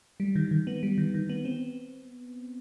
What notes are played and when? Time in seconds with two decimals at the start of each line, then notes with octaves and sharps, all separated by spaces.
0.20 G3
0.35 D#3
0.51 D#3
0.67 B3
0.83 G3
0.98 D#3
1.14 D#3
1.29 B3
1.45 C4